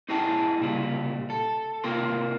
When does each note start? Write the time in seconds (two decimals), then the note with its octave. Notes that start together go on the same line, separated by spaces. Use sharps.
0.09 D#4 E4 G#4 D#5 G#5 A5
0.61 C2 A#2 C#3 G3
1.30 A4
1.84 D#2 C3 A#3 F4 A#4 C6